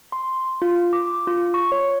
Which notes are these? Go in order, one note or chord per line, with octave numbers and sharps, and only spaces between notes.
C6
F4
D6
F4
C#6
C#5